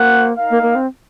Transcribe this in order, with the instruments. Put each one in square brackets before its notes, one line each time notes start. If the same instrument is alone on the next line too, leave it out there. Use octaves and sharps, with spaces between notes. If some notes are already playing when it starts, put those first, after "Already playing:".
Already playing: [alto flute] A#3 [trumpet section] F#4 C5 F#5
[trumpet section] D#4 A#4 F5
[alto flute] A#3
A#3
C4